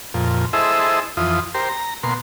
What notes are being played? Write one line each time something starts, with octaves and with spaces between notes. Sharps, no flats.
F2 A#2
E4 G#4 A4 C5 D#5 E5
F2 E3 F4 D#6
G4 A#4 C5
A#5
B2 A#3 C6